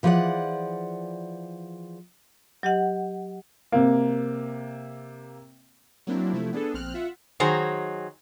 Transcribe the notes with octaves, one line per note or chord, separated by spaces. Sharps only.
E3 F3 G#4 A#4 D5 F#5
F#3 G4 D#5 F#5
C3 A#3
F#3 A#3 C4 D4 E4
C3 F3 A3 E4
B3 D4 G#4 A4
A#1 C4 F6 F#6
F4 E5 F#5
D#3 F#3 G#4 C5 A#5